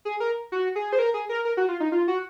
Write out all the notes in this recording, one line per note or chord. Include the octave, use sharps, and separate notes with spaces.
G#4
A#4
F#4
G#4
C5
A#4
G#4
A#4
A#4
F#4
F4
D#4
F4
F#4